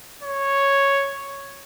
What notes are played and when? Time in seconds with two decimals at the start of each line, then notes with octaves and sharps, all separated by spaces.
0.23 C#5